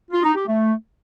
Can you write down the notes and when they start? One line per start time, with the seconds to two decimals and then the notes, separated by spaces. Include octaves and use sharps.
0.11 F4
0.23 D#4
0.35 G4
0.47 A3